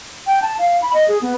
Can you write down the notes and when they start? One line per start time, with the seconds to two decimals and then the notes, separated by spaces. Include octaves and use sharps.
0.27 G5
0.42 A5
0.59 F5
0.82 B5
0.94 D#5
1.08 G#4
1.22 B3